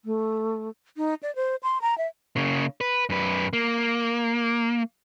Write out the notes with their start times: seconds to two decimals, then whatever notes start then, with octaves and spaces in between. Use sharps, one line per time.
0.05 A3
0.97 D#4
1.23 D5
1.35 C5
1.63 C6
1.82 A#5
1.98 E5
2.36 C#3 A#3
2.81 B4
3.10 F#2 B4
3.53 A#3